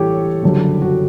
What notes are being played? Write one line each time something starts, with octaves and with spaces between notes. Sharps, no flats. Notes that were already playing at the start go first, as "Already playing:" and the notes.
Already playing: A1 A2 E3 G3 G4 A4 C#5
F#1 F#2 D3 G3
F#4